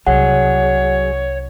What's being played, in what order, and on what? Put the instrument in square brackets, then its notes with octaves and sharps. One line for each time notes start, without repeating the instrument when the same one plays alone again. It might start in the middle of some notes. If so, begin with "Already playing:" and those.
[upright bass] C2 [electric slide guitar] F#3 G#4 [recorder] C#5 [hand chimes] F#5